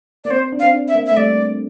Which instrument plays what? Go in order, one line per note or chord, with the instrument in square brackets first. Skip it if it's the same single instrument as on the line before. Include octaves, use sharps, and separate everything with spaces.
[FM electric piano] A#3 [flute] D5
[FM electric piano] C4 [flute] C5
[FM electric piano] D4
[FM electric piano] C4 [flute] F5
[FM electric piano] D4
[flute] E5
[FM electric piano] A#3
[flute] E5
[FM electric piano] A3
[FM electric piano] G3 [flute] D5